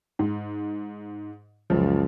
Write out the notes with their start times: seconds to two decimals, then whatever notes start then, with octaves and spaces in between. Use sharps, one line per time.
0.19 G#2
1.70 C#2 F#2 F3